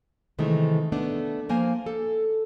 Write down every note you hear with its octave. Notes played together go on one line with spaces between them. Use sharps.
C3 D#3 E3 G#3 A3
A3 B3 D4
F3 A#3 C5 G#5
A4